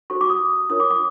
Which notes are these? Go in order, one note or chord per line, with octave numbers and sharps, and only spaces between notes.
F#4 A4 C5 C#6
D6
D#6
D4 F4 A#4 C#5 D#6
D6
D6